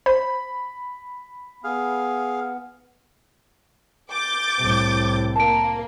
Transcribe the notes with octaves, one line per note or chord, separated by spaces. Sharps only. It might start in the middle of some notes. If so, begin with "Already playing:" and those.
C5 B5
B3 G#4 F5
D6 G6 A6
C2 A2
A#3 A5 D7